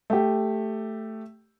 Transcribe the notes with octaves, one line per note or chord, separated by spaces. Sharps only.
A3 G4